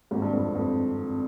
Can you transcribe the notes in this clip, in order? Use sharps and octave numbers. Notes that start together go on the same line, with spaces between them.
G#1 G#2
G2
F2
F2